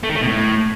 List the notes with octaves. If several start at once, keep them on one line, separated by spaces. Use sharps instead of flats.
A3
D#3
A3
B2
A2